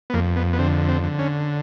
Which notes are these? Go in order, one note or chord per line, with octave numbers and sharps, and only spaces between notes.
B3
F2 A#3
B3
B3
D3 C4
C4
D3
C#4